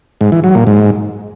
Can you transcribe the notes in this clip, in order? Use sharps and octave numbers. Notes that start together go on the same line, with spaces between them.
G#2
E3
F#3
A#2
G#2